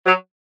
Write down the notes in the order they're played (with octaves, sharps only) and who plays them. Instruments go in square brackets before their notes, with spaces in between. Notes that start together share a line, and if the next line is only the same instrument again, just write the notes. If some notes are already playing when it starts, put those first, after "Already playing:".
[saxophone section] F#3